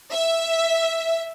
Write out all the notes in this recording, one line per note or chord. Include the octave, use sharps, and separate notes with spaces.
E5